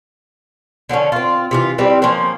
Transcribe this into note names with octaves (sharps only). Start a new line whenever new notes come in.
D3 F3 B3 C#4
C4 F4
C3 E3 F4
G3 C4 E4 B4
F3 A#3 C#4 C5